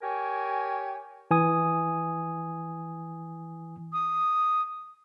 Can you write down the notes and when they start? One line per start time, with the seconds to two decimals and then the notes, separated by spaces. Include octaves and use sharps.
0.02 G4 A#4 C#5 G#5
1.31 E3 G#5 D#6
3.93 D#6